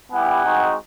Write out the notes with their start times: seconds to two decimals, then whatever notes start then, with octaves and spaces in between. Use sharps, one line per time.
0.12 G3 B3 E4 G4 F#5 G#5
0.44 G#3 C4 D#4 F#4